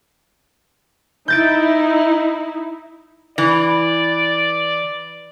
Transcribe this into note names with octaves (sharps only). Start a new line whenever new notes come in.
D#4 E4 G6 A6 D7
E3 D5